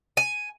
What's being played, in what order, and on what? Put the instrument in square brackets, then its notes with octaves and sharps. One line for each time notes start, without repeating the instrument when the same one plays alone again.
[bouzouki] G#5